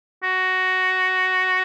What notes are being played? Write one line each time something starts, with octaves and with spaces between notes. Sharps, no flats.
F#4